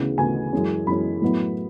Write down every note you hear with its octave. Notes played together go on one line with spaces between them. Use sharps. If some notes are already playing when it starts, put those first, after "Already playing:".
Already playing: D2 C#3 E3 B3
D2 C#3 E3 B3 G#5
F#2 E3 G#3 C#4
F#2 E3 G#3 C#4 B5
A2 F#3 B3 E4